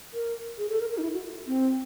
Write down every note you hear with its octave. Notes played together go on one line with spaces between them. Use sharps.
A#4
G#4
A4
A#4
A#4
D#4
E4
F#4
C4